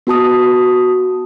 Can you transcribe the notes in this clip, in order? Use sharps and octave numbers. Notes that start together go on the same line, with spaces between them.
B3 F#4 A5 D#6